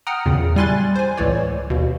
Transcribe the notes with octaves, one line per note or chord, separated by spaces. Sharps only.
F#5 G5 A#5 D#6 F6
E2 A#2 C#3
G3 E4 G#5 C6 F#6 A6
C5 G#5
C#2 A2 E3 C#5 D5
D#2 B2